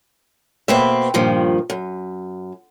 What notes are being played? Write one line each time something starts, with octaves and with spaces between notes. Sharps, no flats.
B2 A#3 C4 B4 E5
G2 A#2 D#3 F3
F#2